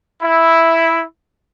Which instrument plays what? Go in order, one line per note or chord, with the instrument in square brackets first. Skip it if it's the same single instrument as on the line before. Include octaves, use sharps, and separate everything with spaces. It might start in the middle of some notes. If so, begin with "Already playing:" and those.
[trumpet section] E4